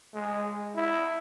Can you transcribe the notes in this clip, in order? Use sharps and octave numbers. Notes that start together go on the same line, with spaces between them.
G#3
E4